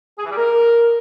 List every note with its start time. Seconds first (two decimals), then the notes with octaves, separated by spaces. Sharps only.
0.18 G#4
0.25 E3
0.31 G3
0.37 A#4